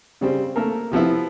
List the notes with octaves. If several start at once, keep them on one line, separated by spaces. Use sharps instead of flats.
C#3 G3 C4
A3 A#3 A4 A#4
C3 F3 B3 E4